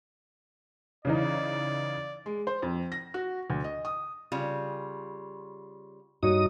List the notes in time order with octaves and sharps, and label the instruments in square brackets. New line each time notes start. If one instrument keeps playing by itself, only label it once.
[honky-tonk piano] C#3 E3 D#4 [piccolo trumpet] D5
[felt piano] G#3
C5
F2
A#6
F#4
D2
D#5
D#6
[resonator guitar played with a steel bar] C#3 G3 F4
[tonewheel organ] G2 D#4 D#6 [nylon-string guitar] F#4 C#5